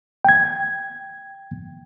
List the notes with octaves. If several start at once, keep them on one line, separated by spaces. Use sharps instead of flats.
G5 G#6